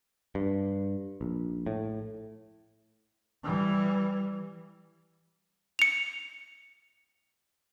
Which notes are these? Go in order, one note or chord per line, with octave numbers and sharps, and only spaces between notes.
G2
A#1
A2
E3 G3
C#7 F7